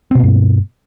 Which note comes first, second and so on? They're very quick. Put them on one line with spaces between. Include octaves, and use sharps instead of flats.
C4 B2 A#3 G2